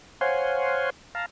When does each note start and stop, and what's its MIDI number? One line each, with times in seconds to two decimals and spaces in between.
0.21 0.90 72
0.21 0.90 73
0.21 0.90 77
0.21 0.90 78
0.21 0.90 80
0.21 0.90 84
1.15 1.26 77
1.15 1.26 81
1.15 1.26 82